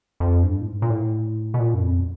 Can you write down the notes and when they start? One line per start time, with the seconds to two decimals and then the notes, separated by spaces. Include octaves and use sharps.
0.20 F2
0.43 G2
0.61 A2
0.66 G#2
0.82 A#2
0.90 A2
1.54 B2
1.59 A#2
1.74 F#2
1.82 F2